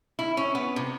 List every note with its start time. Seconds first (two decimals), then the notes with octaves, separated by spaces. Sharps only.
0.19 E4
0.37 C#4
0.55 B3
0.76 C3